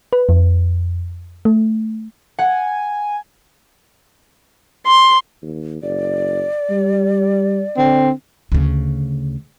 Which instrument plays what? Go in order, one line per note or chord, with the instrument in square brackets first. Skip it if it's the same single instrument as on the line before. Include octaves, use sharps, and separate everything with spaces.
[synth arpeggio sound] B4
F2
A3
[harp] F#5 [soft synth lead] G#5
[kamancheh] C6
[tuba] D#2
[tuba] F#1 [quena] D5
[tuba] G3
[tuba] D3 [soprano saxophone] C4
[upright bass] D2 C#3